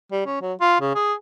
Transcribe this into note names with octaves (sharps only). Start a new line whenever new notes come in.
G3
C#4
F#3
F4
C#3
G#4